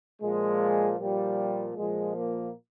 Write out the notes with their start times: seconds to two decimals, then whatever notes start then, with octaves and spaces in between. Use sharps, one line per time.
0.22 A#2 F3 G#3
0.98 A#2 F3 G3
1.76 A#2 F3 G#3
2.15 A#3